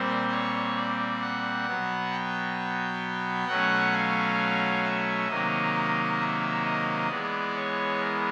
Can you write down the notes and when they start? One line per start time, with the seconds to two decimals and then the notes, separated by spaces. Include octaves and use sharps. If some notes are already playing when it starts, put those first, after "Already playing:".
Already playing: A#2 G3 C4 C5
0.31 C#5
0.76 D5
1.21 F#5
1.66 B2 F#3 B3
2.12 G5
3.47 B2 F#3 A3 C#4 F#5
3.93 F5
4.84 E5
5.28 C3 D#3 F#3 A#3 D#5
6.19 E5
6.64 D#5
7.09 E3 G#3 B3 D5
7.55 C#5
8.00 A#4